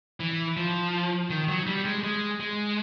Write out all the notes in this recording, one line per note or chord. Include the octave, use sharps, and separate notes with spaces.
E3
F3
D#3
F#3
G3
G#3
G#3
G#3